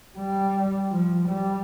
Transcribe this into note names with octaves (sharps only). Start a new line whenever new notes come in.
G3
F3
G3